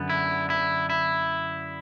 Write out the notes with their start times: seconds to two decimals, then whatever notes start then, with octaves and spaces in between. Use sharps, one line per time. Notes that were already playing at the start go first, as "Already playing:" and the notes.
Already playing: F#2 D3 B3
0.09 E4
0.50 E4
0.90 E4